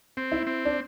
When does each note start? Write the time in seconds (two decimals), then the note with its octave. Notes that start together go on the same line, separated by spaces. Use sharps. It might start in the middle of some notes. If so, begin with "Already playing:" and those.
0.17 C4
0.32 E4
0.47 C4
0.65 D4